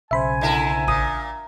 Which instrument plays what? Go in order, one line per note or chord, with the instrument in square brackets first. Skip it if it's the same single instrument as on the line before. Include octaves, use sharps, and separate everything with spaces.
[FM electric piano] B1 C#3 C5 [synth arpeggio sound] E5 B5 [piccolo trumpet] G#5
[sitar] D3 E4 A#4
[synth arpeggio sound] A1 D#6 [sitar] A#2